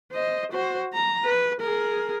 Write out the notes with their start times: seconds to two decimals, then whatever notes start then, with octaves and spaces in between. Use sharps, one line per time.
0.13 C5 D#5
0.52 F#4 C5
0.93 A#5
1.24 B4
1.61 G#4 A#4